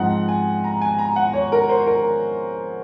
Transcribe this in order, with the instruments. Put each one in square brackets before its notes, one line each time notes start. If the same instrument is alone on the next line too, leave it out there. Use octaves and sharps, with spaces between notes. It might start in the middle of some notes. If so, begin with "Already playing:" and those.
Already playing: [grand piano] G#2 F3 C4 D#4 F#5
G#5
A#5
G#5
A#5
F#5
C#5
A#4
C5
A#4